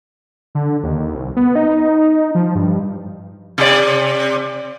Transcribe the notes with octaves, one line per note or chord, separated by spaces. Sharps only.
D3
D#2
C2
B3
D#4
F3
G2
C3 D5